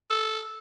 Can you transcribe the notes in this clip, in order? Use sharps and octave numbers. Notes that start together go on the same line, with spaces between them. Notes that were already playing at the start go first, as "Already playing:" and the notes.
A4